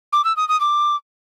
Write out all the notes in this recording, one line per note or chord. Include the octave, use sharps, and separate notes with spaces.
D6
E6
D#6
D#6
D6